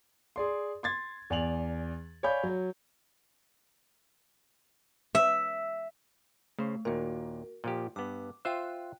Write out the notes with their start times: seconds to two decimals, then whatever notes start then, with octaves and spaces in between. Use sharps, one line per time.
0.36 G#4 D5 C6
0.83 C6 G#6 A6
1.30 E2 D5 G#5 F7 F#7
2.23 C#5 D5 F5 G#5 B5 G6
2.43 F#3
5.15 E5
6.59 C#3 A3 C5
6.85 D#2 A#2 F#4 A#4
7.64 A#2 F3 G4
7.96 G2 B3 D6
8.45 F4 C5 E5 G5 F#6